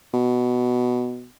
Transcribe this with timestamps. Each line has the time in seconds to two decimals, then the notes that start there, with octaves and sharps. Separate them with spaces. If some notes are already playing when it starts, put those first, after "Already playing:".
0.14 B2